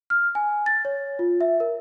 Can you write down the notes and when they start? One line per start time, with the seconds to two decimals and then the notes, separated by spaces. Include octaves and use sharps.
0.10 F6
0.35 G#5
0.66 A6
0.85 C#5
1.19 F4
1.41 E5
1.60 A#4